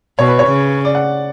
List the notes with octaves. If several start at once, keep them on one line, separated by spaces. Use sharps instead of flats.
B2 C#5
B4
C#5
C#3
D5
F#5